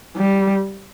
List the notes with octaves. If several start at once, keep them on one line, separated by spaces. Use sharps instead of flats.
G3